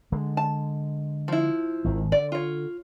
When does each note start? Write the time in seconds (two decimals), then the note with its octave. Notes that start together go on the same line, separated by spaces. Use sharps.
0.12 D3 G#3
0.37 A5
1.28 F3 E4
1.85 G#1 D#3
2.12 D3 D5
2.32 F4 C#5